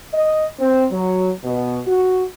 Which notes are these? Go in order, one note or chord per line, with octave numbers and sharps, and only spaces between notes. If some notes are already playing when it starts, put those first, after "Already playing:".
D#5
C4
F#3
B2
F#4